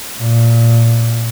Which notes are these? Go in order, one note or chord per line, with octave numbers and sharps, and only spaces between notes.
A#2